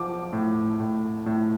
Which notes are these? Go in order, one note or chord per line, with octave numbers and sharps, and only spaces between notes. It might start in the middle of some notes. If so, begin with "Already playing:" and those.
Already playing: F3 D6
A2
A2
A2